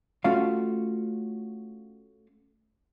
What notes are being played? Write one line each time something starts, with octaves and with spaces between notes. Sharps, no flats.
A3 C#4 F4 F#4 C#5 F5